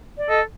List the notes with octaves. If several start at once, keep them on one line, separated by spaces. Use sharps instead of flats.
D5
A4 D#5